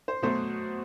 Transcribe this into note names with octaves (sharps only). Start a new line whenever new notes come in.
C5
B2 F#3 A3 C5